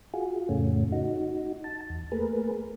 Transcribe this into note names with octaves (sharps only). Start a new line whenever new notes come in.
F4 F#4 G#4
F2 A2 C#3 A3 C#4
D#4 F#4
A5
E2
A3 A#3 G#4 A#4 B4